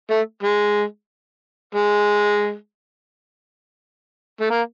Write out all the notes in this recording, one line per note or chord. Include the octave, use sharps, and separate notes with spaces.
A3
G#3
G#3
A3
A#3